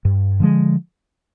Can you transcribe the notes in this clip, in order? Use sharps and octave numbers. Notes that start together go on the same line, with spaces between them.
G2
D3 F3 G#3